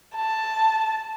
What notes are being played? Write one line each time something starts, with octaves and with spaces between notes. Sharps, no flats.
A5